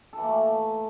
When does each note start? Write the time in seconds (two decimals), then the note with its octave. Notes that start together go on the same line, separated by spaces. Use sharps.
0.13 A4
0.18 E3
0.23 A#3
0.28 A3